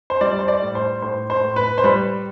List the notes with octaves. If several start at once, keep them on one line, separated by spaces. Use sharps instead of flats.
C5
G3 D5
C5
D5
A2
C5
A2 C5
C5
A2
B4
C5
G3 B4